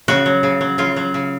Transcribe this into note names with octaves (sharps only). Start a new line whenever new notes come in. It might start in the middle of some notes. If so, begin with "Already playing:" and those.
C#3 F#4
F#3
C#3
F#3
C#3 F4
F#3
C#3